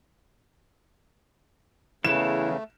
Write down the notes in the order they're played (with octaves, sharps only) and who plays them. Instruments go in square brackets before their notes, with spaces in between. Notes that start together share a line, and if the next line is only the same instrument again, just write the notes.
[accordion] E2 C#3 [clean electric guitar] E3 [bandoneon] A3 [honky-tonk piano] E7